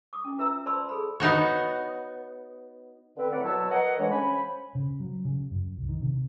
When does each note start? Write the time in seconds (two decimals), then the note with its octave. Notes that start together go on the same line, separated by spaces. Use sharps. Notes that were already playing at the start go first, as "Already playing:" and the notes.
0.13 D6 D#6
0.24 C#4 E4
0.38 F4 B4 E5 A#5 E6
0.66 C5 D5 A5 B5 C6 E6
0.89 G#4 A4 B5
1.20 B3 D#4 F#4 C#5
3.17 D3 C4 B4
3.32 A2 A#4 B4 D5 F#5
3.44 B2 F#3 B4 C#5 A5 E6
3.70 A#4 B4 C#5 D#5 F#5
3.98 F2 E3 G#3 D4 C#5
4.10 C#3 C#4 C5 G#5 B5
4.75 C#3
5.00 F#3
5.25 C#3
5.51 F#2
5.77 C2
5.88 D#3
6.02 C3